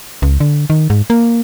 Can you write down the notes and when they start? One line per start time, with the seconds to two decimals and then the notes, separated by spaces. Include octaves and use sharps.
0.22 C#2
0.40 D3
0.70 D#3
0.90 G#2
1.10 A#3